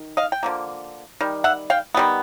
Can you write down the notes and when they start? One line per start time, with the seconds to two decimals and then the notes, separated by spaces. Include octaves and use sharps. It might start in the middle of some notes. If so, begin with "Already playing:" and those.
Already playing: D#3
0.17 D#5 F5
0.32 G5
0.43 D3 F3 A#3
1.21 D#3 G3
1.44 E5 F#5
1.70 F5 G5
1.95 D#3 G3 B3